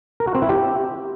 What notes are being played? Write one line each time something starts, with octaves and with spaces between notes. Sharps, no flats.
A#4
F#4
C4
E4
G4